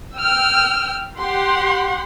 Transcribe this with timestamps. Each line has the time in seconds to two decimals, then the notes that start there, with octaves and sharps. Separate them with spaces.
0.17 G5 E6 F6
1.20 G4 F#5 C6